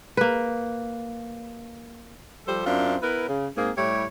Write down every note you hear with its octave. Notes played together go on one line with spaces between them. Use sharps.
A#3 B4
F3 G3 G4 A4 C5
F#2 C4 D4 E4 F4
B3 E4 A#4 B4
C#3
G#2 A#3 C4 G#4
A2 G3 E4 G4 C#5